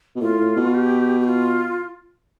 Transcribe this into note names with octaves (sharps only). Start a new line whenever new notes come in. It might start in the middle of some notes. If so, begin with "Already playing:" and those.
B2
A2 F4
A2
B2
G4
G4
F4